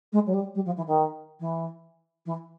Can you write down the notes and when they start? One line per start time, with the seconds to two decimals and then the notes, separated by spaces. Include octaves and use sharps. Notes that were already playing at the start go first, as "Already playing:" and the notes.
0.12 G#3
0.26 F#3
0.33 G3
0.55 G3
0.65 F3
0.77 E3
0.87 D#3
1.40 E3
2.26 E3